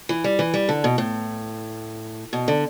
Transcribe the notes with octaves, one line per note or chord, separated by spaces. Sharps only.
E3
G3
E3
G3
D3
B2
A2
B2
D3